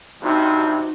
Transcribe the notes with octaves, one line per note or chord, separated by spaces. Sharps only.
G2 C3 D#4 F#4